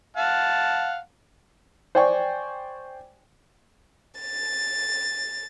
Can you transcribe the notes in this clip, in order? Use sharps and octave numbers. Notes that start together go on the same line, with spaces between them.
F5 F#5 A5
C5 D5 G5 G#5 C#6
A6